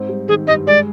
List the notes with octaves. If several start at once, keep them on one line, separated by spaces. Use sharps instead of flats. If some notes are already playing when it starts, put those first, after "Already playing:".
Already playing: G#2 C4
G3
D#3 G#4
G2 D#5
G#3 D5